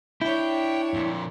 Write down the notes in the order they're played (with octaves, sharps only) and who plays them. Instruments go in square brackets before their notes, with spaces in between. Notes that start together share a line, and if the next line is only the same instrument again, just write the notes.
[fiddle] D4 C#5 [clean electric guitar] E4 [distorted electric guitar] G5
[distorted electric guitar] F2 A#2